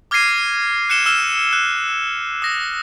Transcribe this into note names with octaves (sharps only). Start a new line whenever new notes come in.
D6 F6 G#6 A#6 C7 D#7
F#6 C#7 E7 G7
E6 F6 E7 G7
F#6
D#6 A#6